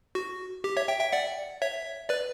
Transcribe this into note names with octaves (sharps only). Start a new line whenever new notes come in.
F#4
G4
C#5 E5
E5 G5
E5 G5
D5 F#5
C#5 E5
B4 D5